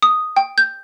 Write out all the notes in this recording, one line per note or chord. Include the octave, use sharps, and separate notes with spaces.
D#6
G5
G6